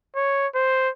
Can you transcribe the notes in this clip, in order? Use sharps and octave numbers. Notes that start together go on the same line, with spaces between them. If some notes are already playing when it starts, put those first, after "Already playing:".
C#5
C5